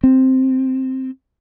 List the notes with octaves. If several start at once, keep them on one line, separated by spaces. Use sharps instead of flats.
C4